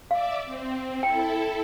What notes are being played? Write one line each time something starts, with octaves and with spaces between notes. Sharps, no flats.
D5 E5 F5 D6
C4
E4 A4 G5